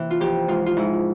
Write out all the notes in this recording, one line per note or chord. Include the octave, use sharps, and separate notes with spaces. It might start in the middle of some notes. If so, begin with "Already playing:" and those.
Already playing: C3 E3 A#3
F4
F2 G4
G#2 F4
F4
G#2 E4